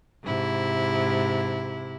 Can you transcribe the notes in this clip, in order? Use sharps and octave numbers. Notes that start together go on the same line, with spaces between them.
G#2 C3 E4